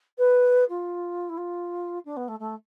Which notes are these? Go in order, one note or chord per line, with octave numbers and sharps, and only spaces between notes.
B4
F4
E4
F4
D4
B3
A3
A3